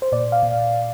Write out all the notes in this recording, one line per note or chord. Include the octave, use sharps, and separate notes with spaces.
C5
A#2 D5
F5
A#2